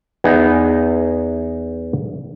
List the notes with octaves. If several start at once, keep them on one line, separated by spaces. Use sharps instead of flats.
E2 B3 D#4 G#4 D#5